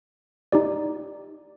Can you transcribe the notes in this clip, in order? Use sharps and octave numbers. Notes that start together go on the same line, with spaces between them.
D#4 G4 D5